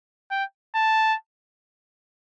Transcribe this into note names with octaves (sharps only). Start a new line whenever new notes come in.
G5
A5